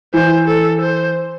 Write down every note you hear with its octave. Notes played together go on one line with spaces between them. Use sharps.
E3 C5
A4
C5